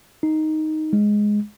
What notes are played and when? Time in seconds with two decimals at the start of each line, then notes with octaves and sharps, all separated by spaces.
0.23 D#4
0.93 G#3